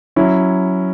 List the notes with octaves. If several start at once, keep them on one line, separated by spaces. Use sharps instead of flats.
F#3 C#4 E4